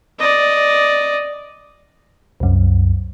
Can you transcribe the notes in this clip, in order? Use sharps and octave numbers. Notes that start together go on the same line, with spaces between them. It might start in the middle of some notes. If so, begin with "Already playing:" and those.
D5 D#5
C2 F#2